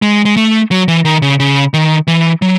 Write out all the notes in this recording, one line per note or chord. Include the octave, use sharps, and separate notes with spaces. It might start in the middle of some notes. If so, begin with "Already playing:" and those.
G#3
G#3
A3
F#3
E3
D#3
C#3
C#3
D#3
E3
F#3